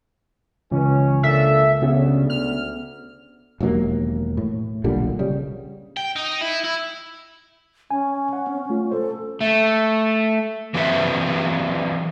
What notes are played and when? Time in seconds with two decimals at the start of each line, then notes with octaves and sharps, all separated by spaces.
0.71 C#2 E3 C#4
1.23 C#3 A#3 D4 A4 E5
1.82 D2 C#3 B3
2.30 F6
3.61 E1 D#2 F#3 A#3
4.37 A2
4.84 B1 A#2 D3 G3
5.19 C#3 G3
5.97 G5
6.16 D#4
6.41 E4
6.64 E4
7.91 C#4 G#5
8.33 F#5
8.47 C4
8.70 A3 F4
8.91 A4 C5
9.41 A3
10.74 E3 F#3 C4 B4 D5 E5